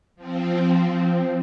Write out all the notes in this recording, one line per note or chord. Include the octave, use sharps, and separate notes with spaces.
F3 C4